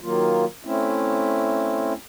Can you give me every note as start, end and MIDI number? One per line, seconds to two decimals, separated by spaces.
0.01 0.45 51
0.01 0.45 54
0.01 0.45 58
0.01 0.45 65
0.65 1.93 57
0.65 1.93 60
0.65 1.93 61
0.65 1.93 64